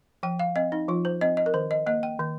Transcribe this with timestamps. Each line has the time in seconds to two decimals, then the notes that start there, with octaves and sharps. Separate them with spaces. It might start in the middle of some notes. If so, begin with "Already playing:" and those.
0.23 F3 G5
0.39 F5
0.56 C4 D#5
0.72 D#4
0.88 F3 F4
1.05 C5
1.21 C4 D#5
1.37 D#5
1.46 A#4
1.54 D#3 C5
1.71 D#5
1.86 A#3 D#5
2.03 G5
2.19 D#3